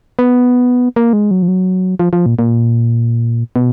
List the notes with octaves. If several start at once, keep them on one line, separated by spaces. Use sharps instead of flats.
B3
A#3
G#3
F#3
F3
F#3
F3
F3
A#2
A#2
B2